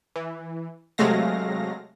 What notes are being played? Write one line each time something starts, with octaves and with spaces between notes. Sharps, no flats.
E3
C3 F#3 G#3 A3 F5 A#6